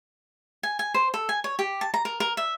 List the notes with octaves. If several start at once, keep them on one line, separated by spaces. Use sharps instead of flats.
G#5
G#5
C5
A4
G#5
C#5
G4
A5
A#5
A#4
A#4
E5